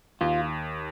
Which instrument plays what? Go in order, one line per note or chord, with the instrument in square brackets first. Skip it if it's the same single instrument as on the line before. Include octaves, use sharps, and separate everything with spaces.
[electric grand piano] D#2 [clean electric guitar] F4